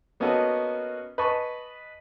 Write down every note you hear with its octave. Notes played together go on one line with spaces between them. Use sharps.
A#3 B3 C#4 D#4 F#4 A4
B4 D#5 G#5 A5 C#6